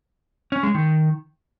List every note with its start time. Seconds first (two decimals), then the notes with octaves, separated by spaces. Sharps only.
0.52 C#4
0.63 G#3
0.74 D#3